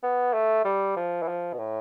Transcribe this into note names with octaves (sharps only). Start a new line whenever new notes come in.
B3
A3
G3
F3
E3
F3
B2
A2